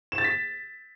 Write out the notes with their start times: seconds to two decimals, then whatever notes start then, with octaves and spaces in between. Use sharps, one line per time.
0.12 E7
0.18 A6
0.24 B6